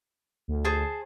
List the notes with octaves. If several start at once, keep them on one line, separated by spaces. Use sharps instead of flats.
D2
G#4 C5 A5